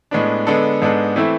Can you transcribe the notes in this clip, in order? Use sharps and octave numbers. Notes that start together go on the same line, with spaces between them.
A2 G#3 B3 D4
D3 G#3 B3 D4 A4
G#2 G#3 B3 D4 A4
E3 A3 C4 E4